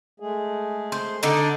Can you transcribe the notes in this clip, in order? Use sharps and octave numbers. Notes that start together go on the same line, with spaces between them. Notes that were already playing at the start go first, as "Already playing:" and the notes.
G#3 A3 G#4
C5
D3 D4 D#4